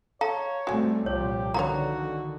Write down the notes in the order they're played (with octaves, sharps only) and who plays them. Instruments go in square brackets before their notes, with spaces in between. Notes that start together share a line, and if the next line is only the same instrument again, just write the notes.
[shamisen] A4 [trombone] C#5 [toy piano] F5 A#5
[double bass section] G3 A3 C4 [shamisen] F#4 G#5
[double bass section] C2 A#2 F3 [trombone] G4 [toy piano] C#5
[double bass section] D3 D#3 [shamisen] A#3 B3 C#5 [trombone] F#4 [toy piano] A#5